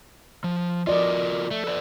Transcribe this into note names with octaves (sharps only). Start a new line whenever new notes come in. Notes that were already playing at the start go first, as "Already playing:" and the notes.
F3
F3 F4 F#4 A#4 D5 D#5
A3
A4 B4 D5